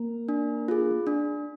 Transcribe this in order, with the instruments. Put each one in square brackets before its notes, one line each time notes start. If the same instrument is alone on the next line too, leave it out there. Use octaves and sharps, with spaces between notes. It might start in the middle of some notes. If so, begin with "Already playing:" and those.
Already playing: [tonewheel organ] A#3
[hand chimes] D4
F4 G#4
D4